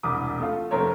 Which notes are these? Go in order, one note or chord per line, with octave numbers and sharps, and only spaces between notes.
E1 C2 B5 D6 D#6
A3 F4
F1 A3 C#4 A#4 C5 C#5